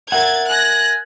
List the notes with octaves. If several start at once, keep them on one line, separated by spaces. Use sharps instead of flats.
A#4 E5 F#5 G#6 A6
G#5 F#6 A#6